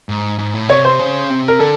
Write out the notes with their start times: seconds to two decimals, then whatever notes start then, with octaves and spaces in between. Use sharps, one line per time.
0.09 G#2
0.39 G#2
0.54 A2
0.69 C3 C#5
0.85 C5
0.99 C#3
1.30 C3
1.48 A#4
1.59 D3 A4